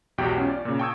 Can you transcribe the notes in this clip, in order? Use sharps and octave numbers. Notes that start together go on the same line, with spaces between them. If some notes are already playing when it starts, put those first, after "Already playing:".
B1 E2 G#2 F#4 G4 G5
C#4 F4
D5
A#2 C#3
G5 A5 C#6 D#6 E6 G#6